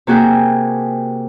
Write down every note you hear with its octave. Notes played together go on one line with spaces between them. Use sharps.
C3 A#3 F#4 G#4 G5